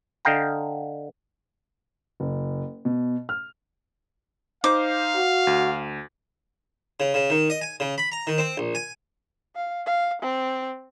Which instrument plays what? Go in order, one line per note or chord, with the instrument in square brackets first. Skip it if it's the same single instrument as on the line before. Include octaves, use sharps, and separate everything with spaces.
[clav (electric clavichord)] D3 D#5 F5 G5 A#5
[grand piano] F#1
B2
F6
[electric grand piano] D#4 C5 [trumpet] F5 [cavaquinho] D6
[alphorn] F#4
[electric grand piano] D2
[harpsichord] C#3
C#3
D#3
D#5
G#5
C#3
B5
A#5
D#3
C4
A#1
G#5
[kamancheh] F5
F5
C4